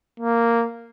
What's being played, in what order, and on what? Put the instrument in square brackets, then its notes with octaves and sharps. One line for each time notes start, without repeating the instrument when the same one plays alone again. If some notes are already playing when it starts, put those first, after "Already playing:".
[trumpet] A#3